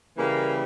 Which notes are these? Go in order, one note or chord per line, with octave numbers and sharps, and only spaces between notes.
C#3 E3 G3 A#3